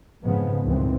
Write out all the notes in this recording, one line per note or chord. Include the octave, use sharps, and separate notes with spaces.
F2 G#2 C#3 F3 G#3 B3
C#2 G2 A#2 D#3 E3 C4